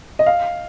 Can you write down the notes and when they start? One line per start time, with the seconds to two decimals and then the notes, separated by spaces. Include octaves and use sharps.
0.19 D#5
0.26 F5